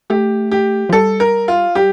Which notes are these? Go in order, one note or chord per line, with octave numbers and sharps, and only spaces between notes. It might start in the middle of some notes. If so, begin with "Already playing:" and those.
A3 G4
G4
F3
G3 A4
A#4
F4
G3 G4